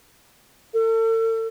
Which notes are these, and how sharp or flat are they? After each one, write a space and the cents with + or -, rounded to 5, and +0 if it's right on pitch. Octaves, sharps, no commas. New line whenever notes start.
A4 +40